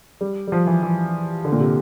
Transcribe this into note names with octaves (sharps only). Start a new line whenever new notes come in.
G3
G3
F3
E3
E3
D3
A#2
C3